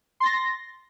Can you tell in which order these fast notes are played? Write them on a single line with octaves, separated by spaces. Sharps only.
C6 A6 A#6